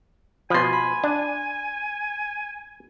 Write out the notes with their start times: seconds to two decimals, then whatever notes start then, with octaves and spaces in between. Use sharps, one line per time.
0.50 B2 F3 G#5 B5 C6
0.73 B5
1.04 D4